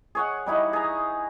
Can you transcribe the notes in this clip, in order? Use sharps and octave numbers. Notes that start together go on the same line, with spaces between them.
G#4 C#5 F#5
G3 D#4 E4 F#5
G#4 A#5